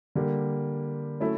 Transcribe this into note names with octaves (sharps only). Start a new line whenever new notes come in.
D3 G3 A#3
F#3 A3 C#4 E4